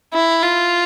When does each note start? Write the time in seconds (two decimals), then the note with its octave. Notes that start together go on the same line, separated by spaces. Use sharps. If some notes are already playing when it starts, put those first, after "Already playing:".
0.13 E4
0.43 F4